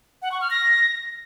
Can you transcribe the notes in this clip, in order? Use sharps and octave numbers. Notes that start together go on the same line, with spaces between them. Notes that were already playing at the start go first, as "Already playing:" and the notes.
F#5
C#6
F6
A#6